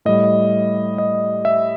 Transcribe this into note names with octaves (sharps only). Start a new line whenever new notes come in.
A2 G3 D#5
D#5
E5